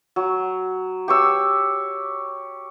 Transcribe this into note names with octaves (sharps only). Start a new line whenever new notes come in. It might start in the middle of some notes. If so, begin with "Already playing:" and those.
F#3
G4 C#5 E6